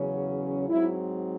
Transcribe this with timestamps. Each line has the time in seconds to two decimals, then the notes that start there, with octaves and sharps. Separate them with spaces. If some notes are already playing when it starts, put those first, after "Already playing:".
Already playing: E2 C#3 F#3 C#4
0.68 G#2 F#3 C4 E4